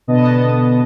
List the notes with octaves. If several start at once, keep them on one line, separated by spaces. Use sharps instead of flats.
B2 D3 B3 D#5 A5